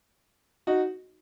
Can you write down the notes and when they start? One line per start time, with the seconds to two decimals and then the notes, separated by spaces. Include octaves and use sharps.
0.67 D#4 F#4